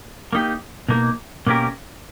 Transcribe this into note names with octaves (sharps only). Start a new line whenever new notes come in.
A#3 D#4 G4
B2 A#3 D#4
B2 A#3 C#4 G4 A#4